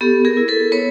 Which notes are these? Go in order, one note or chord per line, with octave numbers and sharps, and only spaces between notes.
B3 G4 A4
G#4 A#4
E4
A4 B4
B3 B4 C#5